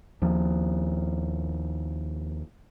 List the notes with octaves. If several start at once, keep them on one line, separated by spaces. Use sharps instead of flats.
D#2 F3